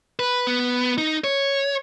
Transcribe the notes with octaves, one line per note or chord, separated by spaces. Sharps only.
B4
B3
D#4
C#5